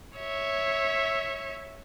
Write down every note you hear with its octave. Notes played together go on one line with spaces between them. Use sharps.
C#5 E5